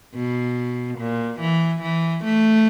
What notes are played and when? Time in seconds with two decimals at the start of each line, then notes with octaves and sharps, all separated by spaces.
0.15 B2
0.99 A#2
1.40 E3
1.82 E3
2.24 A3